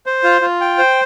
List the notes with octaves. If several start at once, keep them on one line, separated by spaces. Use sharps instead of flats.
C5
F4
F4
G5
C5